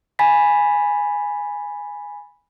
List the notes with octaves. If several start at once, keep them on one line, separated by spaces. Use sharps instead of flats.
G#5 B5 A6 B6